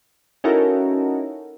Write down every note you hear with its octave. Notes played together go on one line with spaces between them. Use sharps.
C#4 D#4 E4 F#4 A4 A#4